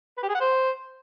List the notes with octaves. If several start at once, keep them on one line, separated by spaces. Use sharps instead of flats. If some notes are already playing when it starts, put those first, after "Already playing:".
B4
G4
G#4
F#5
C5